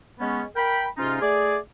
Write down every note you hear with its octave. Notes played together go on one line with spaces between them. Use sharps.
G#3 B3 C#4
A#4 G5 B5
G#2 C3 C#4 D#4 F4
A3 G#4 D5